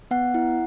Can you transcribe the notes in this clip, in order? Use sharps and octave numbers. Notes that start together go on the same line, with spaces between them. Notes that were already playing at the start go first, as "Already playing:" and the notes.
B3 F#5
E4